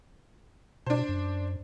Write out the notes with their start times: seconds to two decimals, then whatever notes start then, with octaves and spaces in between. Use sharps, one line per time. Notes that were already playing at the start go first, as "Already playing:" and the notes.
0.86 B2 D4 C5
1.09 F#2